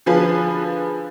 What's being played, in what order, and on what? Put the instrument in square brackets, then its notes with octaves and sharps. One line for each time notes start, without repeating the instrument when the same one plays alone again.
[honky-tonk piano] D3 F3 G#4 B4